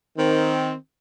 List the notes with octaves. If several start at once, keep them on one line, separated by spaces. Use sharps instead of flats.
D#3 C4